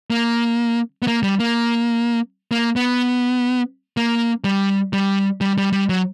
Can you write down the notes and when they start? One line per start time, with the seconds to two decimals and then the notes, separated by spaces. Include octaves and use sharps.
0.10 A#3
1.02 B3
1.07 A#3
1.23 G3
1.39 A#3
2.51 A#3
2.76 B3
3.97 A#3
4.44 G3
4.93 G3
5.41 G3
5.58 G3
5.73 G3
5.89 F#3